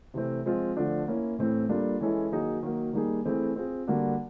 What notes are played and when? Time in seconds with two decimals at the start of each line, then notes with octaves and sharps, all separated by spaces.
0.14 C3 E3 A3 C4
0.45 F3 G#3 C4 F4
0.76 D3 F3 A3 D4 F4
1.08 A#3 C#4 E4
1.39 A2 E3 A3 C4
1.69 G3 A#3 D4 F4 A4
2.01 E3 G#3 C#4 E4 A4
2.31 D#3 F#3 A#3 D#4 G#4
2.63 D#3 F#3 A#3
2.93 D#3 G3 A#3 D#4 G#4
3.25 E3 A3 C4 E4 G#4
3.56 C4 F4 G#4
3.87 D3 G3 A#3 D4 F#4